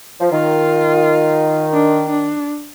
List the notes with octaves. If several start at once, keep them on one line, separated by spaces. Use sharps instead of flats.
F3
D#3 F4
D4
D4